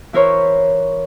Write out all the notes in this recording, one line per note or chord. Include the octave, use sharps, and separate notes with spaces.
E3 E4 A#4 C5 C#5